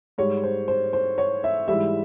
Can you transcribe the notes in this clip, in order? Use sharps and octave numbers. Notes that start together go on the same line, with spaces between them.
G#2 G3 C#5
C5
C5
C5
C#5
E5
G#2 E3 G3 E5